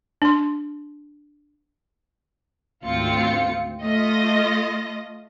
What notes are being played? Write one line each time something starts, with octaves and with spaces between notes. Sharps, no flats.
D4 C6
G#1 D2 C4 F4 C#7
A3 F4 D#5 A#6